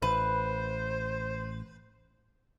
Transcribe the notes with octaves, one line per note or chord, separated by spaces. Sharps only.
A1 B4 C5